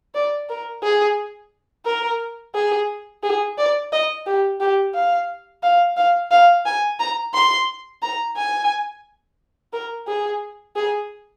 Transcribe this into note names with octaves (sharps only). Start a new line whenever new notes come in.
D5
A#4
G#4
A#4
G#4
G#4
D5
D#5
G4
G4
F5
F5
F5
F5
G#5
A#5
C6
A#5
G#5
A#4
G#4
G#4